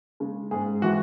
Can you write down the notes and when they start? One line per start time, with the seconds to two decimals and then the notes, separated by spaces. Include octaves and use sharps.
0.20 C#3 G#3
0.51 G#2 G#4
0.82 E3 G#3 F#4